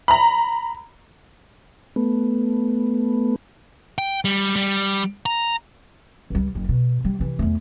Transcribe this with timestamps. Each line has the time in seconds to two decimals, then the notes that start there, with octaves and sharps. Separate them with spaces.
0.08 A#5 B5
1.96 A3 B3
3.98 G5
4.25 G3
4.56 G3
5.26 A#5
6.30 C#2 G3
6.55 F#1 F#2
6.69 B2
7.05 G3
7.19 C3 E3
7.39 E2 A3